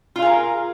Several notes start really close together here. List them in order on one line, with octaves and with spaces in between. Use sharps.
F4 F5 G#4 A#4